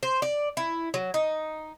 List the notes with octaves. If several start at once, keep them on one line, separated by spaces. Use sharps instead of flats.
C5
D5
E4
F#3
D#4